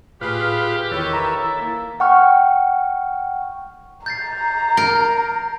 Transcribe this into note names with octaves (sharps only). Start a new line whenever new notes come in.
A2 F4 G4 G#4 B4 F5 B5
E2 D#3 E4 A4 B4 C#5
E5 A#5
A#3
F#5 G5 C#6 F6
A#5 G6 A6 C7
A#4